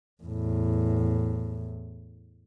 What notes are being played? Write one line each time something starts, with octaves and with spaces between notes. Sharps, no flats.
E2 A2